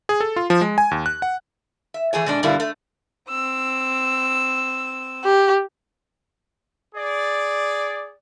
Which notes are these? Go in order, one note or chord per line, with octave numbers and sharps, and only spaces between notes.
G#4
A4
F4
F3
G#3
G#5
D#2
F#6
F#5
E5
E3 A3 G#4 C#5
B2 G#3 D4
G2 B2 D3 G3 A#3 E4
A3
C4 E6
G4
G#4 D5